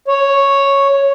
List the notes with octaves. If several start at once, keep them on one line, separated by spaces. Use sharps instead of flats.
C#5